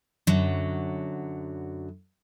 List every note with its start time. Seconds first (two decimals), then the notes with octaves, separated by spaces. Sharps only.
0.27 F#2 D3 F#3